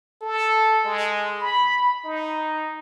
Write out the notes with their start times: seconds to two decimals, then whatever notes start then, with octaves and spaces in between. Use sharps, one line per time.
0.22 A4
0.85 G#3
1.41 B5
2.04 D#4